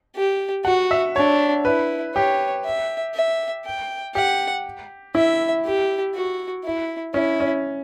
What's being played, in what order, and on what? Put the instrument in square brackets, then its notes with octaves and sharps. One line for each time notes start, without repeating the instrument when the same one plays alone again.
[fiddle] G4
[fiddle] F#4 [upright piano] F#5
[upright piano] E5
[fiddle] D4 [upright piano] C#5
[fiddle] E4 [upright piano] B4
[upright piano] G4 [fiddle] C#5
[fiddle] E5
E5
G5
[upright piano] G4 [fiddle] F#5
[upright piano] E4 [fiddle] E5
[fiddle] G4
F#4
E4
[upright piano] C#4 [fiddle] E4
[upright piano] C#4